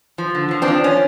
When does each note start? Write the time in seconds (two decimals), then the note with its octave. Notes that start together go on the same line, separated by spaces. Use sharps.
0.18 F3
0.35 D3
0.51 F3
0.62 C4 D4
0.68 F3
0.84 C#4